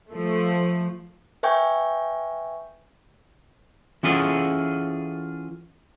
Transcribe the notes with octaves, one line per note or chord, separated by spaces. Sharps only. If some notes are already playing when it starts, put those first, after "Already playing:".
F3 A3
B4 E5 G5 G#5 C#6 G6
E3 C#4 F4 G#4 A4 F#5